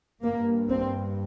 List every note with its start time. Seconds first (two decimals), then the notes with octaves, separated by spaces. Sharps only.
0.22 G2 A#3
0.69 C4